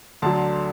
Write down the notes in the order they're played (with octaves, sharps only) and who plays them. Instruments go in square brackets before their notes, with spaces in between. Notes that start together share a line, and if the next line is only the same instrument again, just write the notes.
[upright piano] D2 D3 F#3 A5 C6